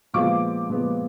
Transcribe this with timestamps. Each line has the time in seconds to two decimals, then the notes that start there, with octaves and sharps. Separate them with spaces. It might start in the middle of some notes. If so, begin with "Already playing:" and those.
0.14 A#2 F3 G#3 B3 D6
0.69 A#2 F3 G#3 B3